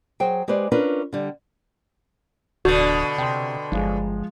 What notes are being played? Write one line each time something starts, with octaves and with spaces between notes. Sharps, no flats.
F#3 G#4 C5 G5
G#3 G4 G#4 B4 C5 D5
C#4 D4 F4 A#4 B4
D3 G3
D1 B2 D3 F#4 G6
C3 G5 C6
G1 F3 G#3